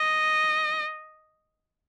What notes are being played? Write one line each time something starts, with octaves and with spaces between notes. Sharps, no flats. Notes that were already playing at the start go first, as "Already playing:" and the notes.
Already playing: D#5